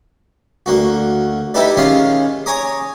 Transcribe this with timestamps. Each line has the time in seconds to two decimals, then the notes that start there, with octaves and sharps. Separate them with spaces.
0.66 D2 A#3 F#4
1.54 D#4 E4 G4 A4 B4 D5
1.77 D#3 G#3 C#4 F4 F5
2.46 C#5 G#5 A#5 D6 D#6